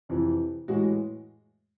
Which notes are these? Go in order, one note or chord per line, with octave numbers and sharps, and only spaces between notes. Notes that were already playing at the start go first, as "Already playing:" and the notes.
F2 C3 E3
A2 E3 G#3 F#4